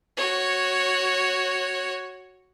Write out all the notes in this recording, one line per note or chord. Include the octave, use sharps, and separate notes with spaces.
F#4 C#5